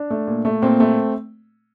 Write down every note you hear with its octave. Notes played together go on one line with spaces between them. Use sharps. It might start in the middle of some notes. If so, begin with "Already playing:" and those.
Already playing: D4
A3
A#2
A3
A#2 C4
A3